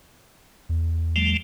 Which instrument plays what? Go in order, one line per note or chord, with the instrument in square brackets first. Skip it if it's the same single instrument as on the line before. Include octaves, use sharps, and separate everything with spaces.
[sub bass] E2
[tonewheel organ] F3 G3 A3